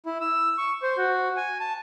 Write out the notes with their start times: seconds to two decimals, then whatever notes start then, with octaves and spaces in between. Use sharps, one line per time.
0.06 E4
0.21 E6
0.58 C#6
0.83 C5
0.97 F#4
1.37 G#5
1.60 A5